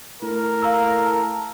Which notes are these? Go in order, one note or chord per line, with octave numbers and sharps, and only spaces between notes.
A2 A#4
F5 A#5 E6
A5